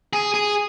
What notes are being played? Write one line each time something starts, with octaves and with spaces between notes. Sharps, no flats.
G#4
G#4